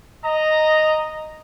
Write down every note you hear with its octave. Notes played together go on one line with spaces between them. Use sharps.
D#5 A#5